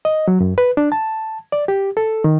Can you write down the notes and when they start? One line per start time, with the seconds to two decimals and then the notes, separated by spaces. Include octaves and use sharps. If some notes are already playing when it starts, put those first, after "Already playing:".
0.05 D#5
0.28 F#3
0.40 F#2
0.58 B4
0.77 D4
0.92 A5
1.52 D5
1.68 G4
1.97 A4
2.24 D#3